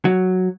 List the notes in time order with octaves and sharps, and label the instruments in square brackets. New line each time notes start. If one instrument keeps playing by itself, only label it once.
[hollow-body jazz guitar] F#3